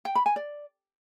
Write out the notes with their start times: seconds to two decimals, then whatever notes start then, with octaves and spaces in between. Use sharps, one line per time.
0.05 G5
0.15 B5
0.26 G#5
0.36 D5